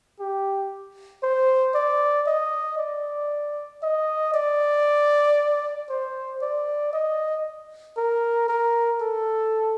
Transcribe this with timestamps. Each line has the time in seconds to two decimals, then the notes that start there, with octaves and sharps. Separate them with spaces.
0.20 G4
1.23 C5
1.75 D5
2.27 D#5
2.78 D5
3.82 D#5
4.34 D5
5.90 C5
6.42 D5
6.93 D#5
7.97 A#4
8.48 A#4
9.01 A4